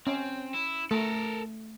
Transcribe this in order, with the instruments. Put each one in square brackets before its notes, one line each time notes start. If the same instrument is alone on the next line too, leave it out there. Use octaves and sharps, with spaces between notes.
[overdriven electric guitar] C4 [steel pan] C#4
[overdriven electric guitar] E4
[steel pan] A3 [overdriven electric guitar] A4 A#4